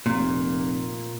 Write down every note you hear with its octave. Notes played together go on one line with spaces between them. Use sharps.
F1 A#2